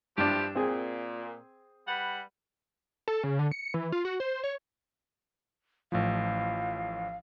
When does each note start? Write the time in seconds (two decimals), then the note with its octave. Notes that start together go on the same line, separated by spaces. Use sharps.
0.18 G2 F3 D4 E4 G4
0.55 A#2 C4 G#4
1.88 G3 B4 F#5
3.08 A4
3.24 C#3
3.39 D3
3.51 C#7
3.74 E3
3.92 F4
4.05 F#4
4.20 C5
4.44 C#5
5.92 A1 A2 F3 F5